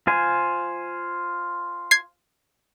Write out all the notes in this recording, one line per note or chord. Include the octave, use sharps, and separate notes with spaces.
F4 C5 G#5
G#6 C7